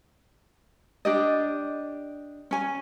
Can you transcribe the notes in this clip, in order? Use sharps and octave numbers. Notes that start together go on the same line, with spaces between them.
D4 G4 D#5
C#4 G#5